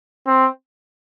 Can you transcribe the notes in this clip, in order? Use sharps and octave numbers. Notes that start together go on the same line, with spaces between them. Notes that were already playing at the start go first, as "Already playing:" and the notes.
C4